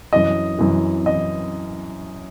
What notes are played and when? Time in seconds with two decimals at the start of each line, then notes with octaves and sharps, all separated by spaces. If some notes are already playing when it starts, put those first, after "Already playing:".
0.13 F#2 E3 D#5
0.59 F#2 E3
1.06 E3 D#5